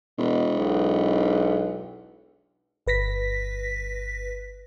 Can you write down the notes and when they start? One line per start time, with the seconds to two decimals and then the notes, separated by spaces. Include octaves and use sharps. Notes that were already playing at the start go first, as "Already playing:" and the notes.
0.18 E1 B2
0.56 B1
2.87 G1 B4 A#6 B6